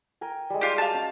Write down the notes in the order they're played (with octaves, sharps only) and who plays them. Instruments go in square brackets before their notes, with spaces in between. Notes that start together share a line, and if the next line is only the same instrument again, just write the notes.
[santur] A#4 G5 G#5
G3 G#3
[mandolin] F4 G4
[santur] F#4 [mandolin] F5 A5
[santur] C#4